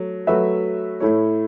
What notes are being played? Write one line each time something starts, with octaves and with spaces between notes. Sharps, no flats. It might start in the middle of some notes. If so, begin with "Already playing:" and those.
Already playing: F#3 A3
F#3 A3 F#4 B4 E5
A2 A3 E4 C#5